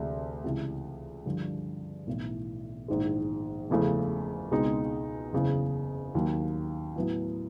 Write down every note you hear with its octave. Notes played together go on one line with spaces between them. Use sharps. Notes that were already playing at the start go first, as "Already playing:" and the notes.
Already playing: D2 C3 E3 G#3
C#2 C3 E3
G2 D3 F3
B1 A2 E3
A#1 G#2 D#3 G#3
F#1 E2 C#3 F3 A3
C#2 B2 G#3 C4 D#4
F#1 E2 C#3
D#2 D#3 F#3 A#3
A2 F#3 B3 E4